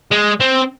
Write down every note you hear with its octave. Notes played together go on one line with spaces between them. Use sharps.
G#3
C4